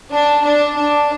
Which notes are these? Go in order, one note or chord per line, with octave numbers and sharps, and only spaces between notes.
D4
D4
D4